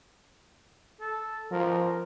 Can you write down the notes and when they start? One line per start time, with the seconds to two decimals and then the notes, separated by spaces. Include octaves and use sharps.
1.01 A4
1.51 F3 A#4